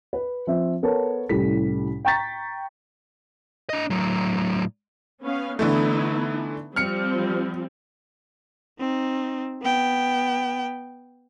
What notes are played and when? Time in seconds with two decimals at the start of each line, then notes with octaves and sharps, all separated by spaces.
0.13 B4
0.47 F3 C4 E5
0.83 B3 A4 A#4 C#5 A5
1.29 C2 A2 G3 C#4 A4 B6
2.05 G5 A#5 C#6 G6 A6 B6
3.70 D4 D#5
3.90 A2 F#3
5.23 B3 C#4 F5
5.59 D3 E3 A3 B3 D#4 E4
6.76 F3 G3 C4 F6 C#7
8.80 C4 D#4
9.62 B3 G5